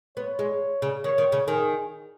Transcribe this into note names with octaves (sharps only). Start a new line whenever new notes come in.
B3 C#5
G#3
C#3
D#3 C#5
D#3
C#3
D#3 G#4